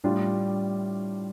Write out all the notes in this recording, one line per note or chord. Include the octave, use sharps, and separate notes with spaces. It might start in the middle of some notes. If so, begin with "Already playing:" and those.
A2 G3 D4 F4